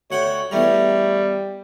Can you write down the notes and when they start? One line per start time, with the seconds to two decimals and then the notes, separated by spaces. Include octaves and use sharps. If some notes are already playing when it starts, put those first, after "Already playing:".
0.11 D2 C#5 F#5 G5
0.51 E2 G3 A3 A#5